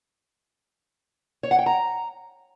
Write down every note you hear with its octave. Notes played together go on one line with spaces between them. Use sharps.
C#5
F#5
G5
A#5